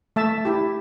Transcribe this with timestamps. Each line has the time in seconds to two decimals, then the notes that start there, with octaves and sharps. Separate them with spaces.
0.16 A3 E5 A5
0.45 E4 G4